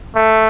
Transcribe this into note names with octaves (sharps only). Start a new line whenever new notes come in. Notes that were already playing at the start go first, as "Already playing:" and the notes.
A3